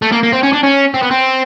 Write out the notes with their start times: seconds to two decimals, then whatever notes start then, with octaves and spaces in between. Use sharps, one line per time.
0.02 A3
0.12 A#3
0.23 A#3
0.32 C4
0.43 C#4
0.53 D4
0.63 C#4
0.94 C4
1.02 B3
1.11 C4